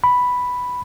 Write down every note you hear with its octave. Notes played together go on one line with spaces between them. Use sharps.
B5